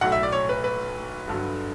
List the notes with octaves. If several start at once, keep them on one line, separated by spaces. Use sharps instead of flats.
B1 A2 F#3 F#5
E5
D5
C#5
B4
B4
G1 G2 D3 F#3